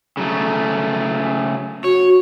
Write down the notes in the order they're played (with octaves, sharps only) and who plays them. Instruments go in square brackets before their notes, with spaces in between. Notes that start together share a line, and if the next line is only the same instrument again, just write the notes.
[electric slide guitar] C#3 F#3 A3
[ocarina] F#4 [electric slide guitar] C#5